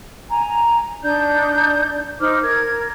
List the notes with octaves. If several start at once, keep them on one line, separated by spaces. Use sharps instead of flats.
G#5 A#5
D4 D#4 D5 G6
D#4 C5 D6 F6
A#4 G#6